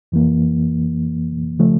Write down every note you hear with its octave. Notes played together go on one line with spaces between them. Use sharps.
F2 E3 A#3
C#3 F3 A3